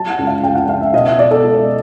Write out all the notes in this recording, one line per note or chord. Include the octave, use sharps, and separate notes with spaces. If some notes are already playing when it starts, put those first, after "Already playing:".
Already playing: F#3 A5
F#5
C#2
F5
C#2 G5
F#5
C#2 F5
E5
B2 D#5
E5
B2 D5
A4
G#3